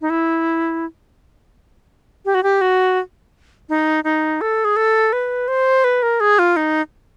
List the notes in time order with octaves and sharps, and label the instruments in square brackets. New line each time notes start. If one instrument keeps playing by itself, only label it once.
[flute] D#4
E4
G4
F#4
G4
F#4
D#4
D#4
A4
G#4
A4
B4
C5
B4
A#4
G#4
F4
D#4